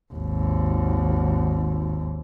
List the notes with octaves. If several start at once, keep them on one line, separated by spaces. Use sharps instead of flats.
G#1 D#2